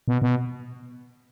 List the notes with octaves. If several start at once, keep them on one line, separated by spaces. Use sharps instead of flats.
B2
B2